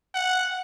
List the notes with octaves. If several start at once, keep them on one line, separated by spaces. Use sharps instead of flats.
F#5